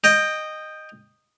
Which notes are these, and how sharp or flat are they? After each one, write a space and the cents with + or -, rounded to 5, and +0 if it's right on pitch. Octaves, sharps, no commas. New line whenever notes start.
D#5 -10 G5 +15